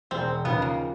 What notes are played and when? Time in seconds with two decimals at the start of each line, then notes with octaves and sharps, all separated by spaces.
0.11 E1 C4
0.45 D#2 C#3 F3 B3
0.62 A#3